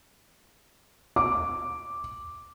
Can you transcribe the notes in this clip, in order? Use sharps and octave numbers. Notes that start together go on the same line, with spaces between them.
D6